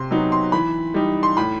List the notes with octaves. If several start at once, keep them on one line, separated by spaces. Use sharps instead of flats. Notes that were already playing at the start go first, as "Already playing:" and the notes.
Already playing: C3 C6
F#3 B3 D#4
C6
E3 B5
G3 D#4
C6
A2 B5